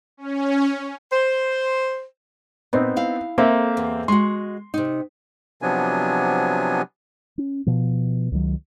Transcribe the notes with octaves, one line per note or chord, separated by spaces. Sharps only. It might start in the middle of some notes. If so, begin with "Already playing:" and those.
C#4
C5
A#2 B3 C4 D#4
E4 F5
A#3 C4 A4 E5
E2
G#3 F#4 C6
C3 D#4
C3 F3 F#3 B3 D4 G#5
C#4
B2 F3
C#2 D#3 F#3